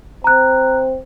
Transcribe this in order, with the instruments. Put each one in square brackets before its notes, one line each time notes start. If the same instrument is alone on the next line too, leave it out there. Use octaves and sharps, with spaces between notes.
[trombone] C4 [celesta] A#5 F#6